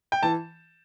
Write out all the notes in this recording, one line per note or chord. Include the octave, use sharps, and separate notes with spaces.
G5
E3 A5